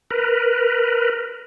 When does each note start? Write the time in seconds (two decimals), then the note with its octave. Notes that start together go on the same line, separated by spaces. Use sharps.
0.11 A#4 B4